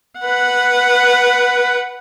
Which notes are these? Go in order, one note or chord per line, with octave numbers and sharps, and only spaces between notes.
B4 F#5